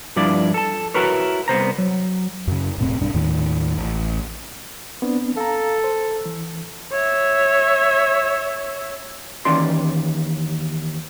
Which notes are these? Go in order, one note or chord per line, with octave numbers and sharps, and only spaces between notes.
G2 F3 D4 E4 D5
A4 A5
E4 F#4 A#4 B4 C#5
C2 B3 C5 A#5
F#3
F#2 C#3
E1 A2 C4
B1 G2 D4
D#2 A2 D#3
A1
B3 C4 D4
A4 F5 A#5
C5
E3
C#5 E5
D#2 D#3 E3 C#4 D5 C6